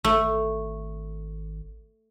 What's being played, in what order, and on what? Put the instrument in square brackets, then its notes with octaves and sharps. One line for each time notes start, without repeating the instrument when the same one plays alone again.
[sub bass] G#1 [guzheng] A3